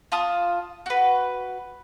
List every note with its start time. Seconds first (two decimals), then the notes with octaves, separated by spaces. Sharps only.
0.12 F4 A5 D#6
0.86 F#4 B4